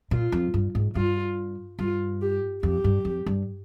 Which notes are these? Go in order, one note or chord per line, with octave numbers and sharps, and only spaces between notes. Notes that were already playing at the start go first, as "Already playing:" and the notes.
A#2 F4
F2
G2
G#2
G2 F4
G2 F4
G4
F2 G4
G2
F2
G2